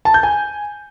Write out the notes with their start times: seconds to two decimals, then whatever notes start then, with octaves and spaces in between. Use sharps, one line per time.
0.05 A5
0.14 G6
0.23 G#5